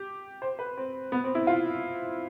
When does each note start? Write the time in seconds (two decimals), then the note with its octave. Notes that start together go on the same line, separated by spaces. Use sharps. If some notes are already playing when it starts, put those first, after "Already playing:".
Already playing: G4
0.42 C5
0.59 B4
0.77 C4
1.12 B3
1.24 C4
1.35 E4
1.47 F4